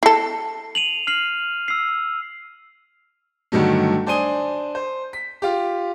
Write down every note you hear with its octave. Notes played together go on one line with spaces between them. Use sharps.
E4 A4 C7
D#7 F7 F#7
F6 C7 F#7
E6 C7
G2 D3 D#3 F#3 A3
D4 C5 G#5 D#6 D#7 G7
C5
B6
F4 G4